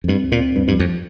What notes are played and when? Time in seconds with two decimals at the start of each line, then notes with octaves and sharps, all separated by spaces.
0.04 F2
0.08 G2 C4
0.24 D2
0.32 A#2
0.40 C4
0.55 D2 G2
0.68 G2
0.72 F3
0.79 F2